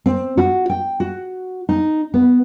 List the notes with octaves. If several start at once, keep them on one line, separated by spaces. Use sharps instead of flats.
C4
F#4
G5
F#4
D#4
B3